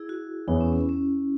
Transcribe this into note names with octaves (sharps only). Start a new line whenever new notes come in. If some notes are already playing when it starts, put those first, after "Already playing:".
Already playing: E4 G#4
F#4
E2 E3 B3 E4 G#4 C#5
C#4
C#4
C#4